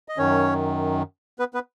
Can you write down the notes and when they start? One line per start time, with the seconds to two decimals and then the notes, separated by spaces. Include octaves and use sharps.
0.08 D#5
0.18 F#2 D#3 C#4 C#5
1.39 B3 B4
1.54 B3 B4